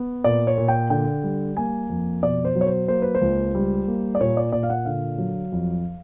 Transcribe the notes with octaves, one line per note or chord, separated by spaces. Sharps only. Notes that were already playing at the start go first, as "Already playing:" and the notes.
Already playing: B3
A#2 D5
C#5
A#2
G5
D3 G5
G3
A#3 G#5
F2
B2 D5
C5
F#3
C#5
C5
A#3 C5
B4
C5
C#2
G3
A#3
D5
A#2 C#5
D5
A#2 D5
F5
F#5
D3 F5
F#3
F2